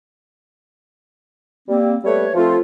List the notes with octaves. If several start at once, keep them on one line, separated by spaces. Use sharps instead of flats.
G3 A#3 C4
G3 A3 B4 C#5
F3 A3 C4 F4